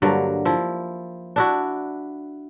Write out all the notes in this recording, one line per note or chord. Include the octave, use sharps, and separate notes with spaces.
G2 D3 F#3 A#3
F3 E4
D4 E4 F#4